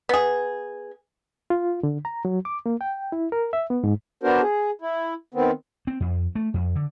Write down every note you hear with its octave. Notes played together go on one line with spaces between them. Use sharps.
B3 G#4
F4
D3
A#5
F#3
D6
A#3
G5
E4
A#4
E5
B3
G#2
B3 D4 F#4 A#4 C5
G#4
E4
D#3 B3 C4
C4
F2
A3
F2
D3